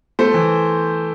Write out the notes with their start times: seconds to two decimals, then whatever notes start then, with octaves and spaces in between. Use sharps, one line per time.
0.19 A3 C5
0.34 E3